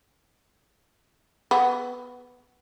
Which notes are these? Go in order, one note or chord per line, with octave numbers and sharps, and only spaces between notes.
B3